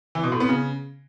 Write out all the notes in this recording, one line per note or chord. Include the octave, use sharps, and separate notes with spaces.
E3
B2
A2
B3
C#3